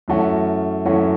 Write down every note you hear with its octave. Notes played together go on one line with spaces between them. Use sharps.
F#2 E3 A3 C#4 F#4
F#2 E3 A3 C#4 F#4